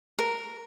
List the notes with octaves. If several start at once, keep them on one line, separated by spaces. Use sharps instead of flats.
A#4